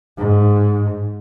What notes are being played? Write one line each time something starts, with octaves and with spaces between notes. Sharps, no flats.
G#2